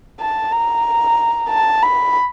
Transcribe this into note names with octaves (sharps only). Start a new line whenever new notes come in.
A5
A#5
A5
B5